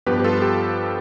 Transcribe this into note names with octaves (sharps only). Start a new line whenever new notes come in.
G2 F3 B3 G4 B4
G4
F4 A4
G4